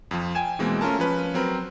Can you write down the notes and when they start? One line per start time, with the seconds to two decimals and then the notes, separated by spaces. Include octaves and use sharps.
0.11 F2 F3
0.35 G5 G#5 G#6 E7
0.59 B2 E3 G#3 A#3 C4
0.81 A3 C#4 F4 A#4 A5
0.99 F3 C#4 B4
1.34 F#3 C4 A#4 B4